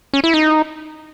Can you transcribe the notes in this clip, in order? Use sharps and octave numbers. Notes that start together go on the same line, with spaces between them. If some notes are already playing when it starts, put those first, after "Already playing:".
C#4
E4
D#4